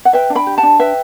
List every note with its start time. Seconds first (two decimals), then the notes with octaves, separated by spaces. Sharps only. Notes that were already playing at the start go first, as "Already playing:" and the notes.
0.05 F#5
0.13 B4 E5 G5
0.30 D4
0.35 G5 B5
0.47 G4
0.58 F#5 A5
0.63 D4
0.79 B4 E5 G5